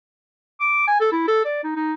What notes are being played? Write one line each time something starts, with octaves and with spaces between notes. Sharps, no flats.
D6
G#5
A4
E4
A4
D5
D#4
D#4